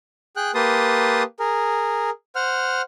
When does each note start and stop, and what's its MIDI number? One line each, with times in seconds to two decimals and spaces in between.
0.36 0.51 68
0.36 0.51 79
0.36 0.51 90
0.55 1.23 58
0.55 1.23 67
0.55 1.23 71
0.55 1.23 81
0.55 1.23 84
0.55 1.23 87
1.39 2.10 68
1.39 2.10 70
2.35 2.82 72
2.35 2.82 78
2.35 2.82 89